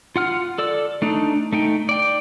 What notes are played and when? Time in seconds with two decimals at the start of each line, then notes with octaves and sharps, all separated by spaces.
0.16 F4 F#5 F6
0.58 A4 D5 E6
1.02 A3 D4 D#4
1.53 A3 D#4 G5
1.89 D5 G5